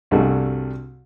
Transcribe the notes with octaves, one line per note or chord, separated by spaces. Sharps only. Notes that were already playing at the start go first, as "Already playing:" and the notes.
C2 G2 G3 A3 F#4 G#4